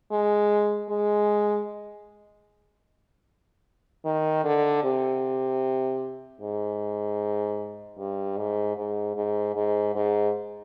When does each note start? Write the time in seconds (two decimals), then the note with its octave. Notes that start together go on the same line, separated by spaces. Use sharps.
0.11 G#3
0.90 G#3
4.05 D#3
4.44 D3
4.83 C3
6.41 G#2
7.98 G2
8.37 G#2
8.77 G#2
9.16 G#2
9.56 G#2
9.95 G#2